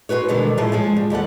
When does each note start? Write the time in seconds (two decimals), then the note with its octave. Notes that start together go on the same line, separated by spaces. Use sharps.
0.09 C4 D#4 F#4 B4 C#5
0.29 B2 D3 D#3 G3 G#3
0.58 A2 F3 G#3 A3
0.72 F3 G#3 G#4
0.97 G3
1.10 D#2 G3 A4 F#5